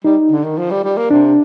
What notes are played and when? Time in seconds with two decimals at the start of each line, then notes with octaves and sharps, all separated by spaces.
0.04 G3 D#4
0.31 D3
0.44 D#3
0.58 F3
0.71 G3
0.84 G3
0.97 A#3
1.11 C3 D4